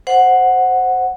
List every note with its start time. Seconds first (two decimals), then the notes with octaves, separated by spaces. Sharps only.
0.07 C5 F#5